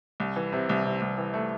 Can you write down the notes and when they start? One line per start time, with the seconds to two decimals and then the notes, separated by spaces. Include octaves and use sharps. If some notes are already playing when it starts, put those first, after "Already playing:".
0.20 C2
0.36 E3
0.53 C3
0.69 C2
0.86 C3
1.02 C2
1.18 E3
1.34 A3